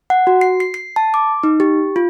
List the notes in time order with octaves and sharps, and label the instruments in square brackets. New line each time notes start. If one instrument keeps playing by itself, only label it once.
[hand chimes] F#5
F#4
C7
C7
C7
A5
D6
D#4
G4
F4